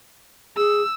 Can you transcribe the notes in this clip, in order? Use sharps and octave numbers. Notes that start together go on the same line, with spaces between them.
G#4 E6